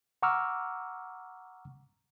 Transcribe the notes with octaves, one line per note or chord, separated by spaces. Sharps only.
F#5 A#5 C#6 D6 E6 F6